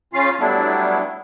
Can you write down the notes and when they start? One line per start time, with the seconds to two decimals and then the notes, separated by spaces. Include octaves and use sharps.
0.13 C#3 C#4 F4 F5
0.40 F#3 G3 A3 B3 D4 E4